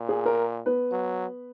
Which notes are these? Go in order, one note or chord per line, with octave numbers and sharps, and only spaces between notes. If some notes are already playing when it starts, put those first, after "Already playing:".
Already playing: A#2
G#4
A#4
B3 B4
F#3